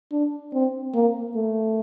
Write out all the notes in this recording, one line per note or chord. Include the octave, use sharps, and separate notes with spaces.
D4
C4
A#3
A3